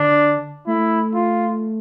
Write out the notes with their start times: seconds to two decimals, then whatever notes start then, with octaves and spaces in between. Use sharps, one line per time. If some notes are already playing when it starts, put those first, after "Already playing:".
Already playing: D3 D4
0.67 A3 E4
1.14 F4